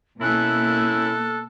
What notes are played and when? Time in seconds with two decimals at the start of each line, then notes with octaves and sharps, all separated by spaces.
0.22 B2 A#3 C#4 E4 A4 F#6